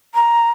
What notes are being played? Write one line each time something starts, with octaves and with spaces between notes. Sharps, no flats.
A#5